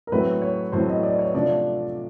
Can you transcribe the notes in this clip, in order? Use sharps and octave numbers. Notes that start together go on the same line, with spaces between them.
A#4
A2 F#3 A3 C4 B4
C#5
A2 F#3 A3 C4 C5
D#5
D5
C#5
C3 F3 A3 D4 D5